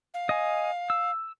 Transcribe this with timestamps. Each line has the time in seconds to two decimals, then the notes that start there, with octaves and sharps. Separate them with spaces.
0.14 F5
0.29 D#5 G#5
0.90 E6